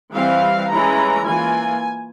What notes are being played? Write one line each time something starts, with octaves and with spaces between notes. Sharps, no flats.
E3 G3 C4 F5
E3 G#3 C#4 E4 A#5
E3 A#3 F4 G#5